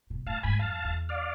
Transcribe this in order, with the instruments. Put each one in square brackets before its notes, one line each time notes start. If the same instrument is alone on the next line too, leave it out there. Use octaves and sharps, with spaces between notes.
[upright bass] B2
[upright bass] A2 [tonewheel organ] F5 A5
[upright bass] G#2 [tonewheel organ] G#5 B5
[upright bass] F2 [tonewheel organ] F5 A5
[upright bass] E2
[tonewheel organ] D5 F5